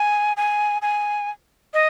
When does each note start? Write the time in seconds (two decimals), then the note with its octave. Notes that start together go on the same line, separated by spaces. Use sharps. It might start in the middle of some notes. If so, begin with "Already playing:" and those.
Already playing: G#5
0.37 G#5
0.82 G#5
1.74 D#5